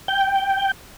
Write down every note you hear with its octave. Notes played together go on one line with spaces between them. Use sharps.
G5